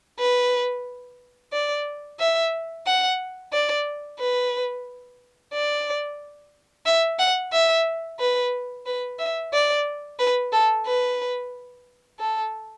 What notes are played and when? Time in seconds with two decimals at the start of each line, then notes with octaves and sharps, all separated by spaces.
0.19 B4
1.53 D5
2.19 E5
2.86 F#5
3.52 D5
4.20 B4
5.53 D5
6.86 E5
7.19 F#5
7.53 E5
8.19 B4
8.86 B4
9.19 E5
9.53 D5
10.20 B4
10.53 A4
10.86 B4
12.19 A4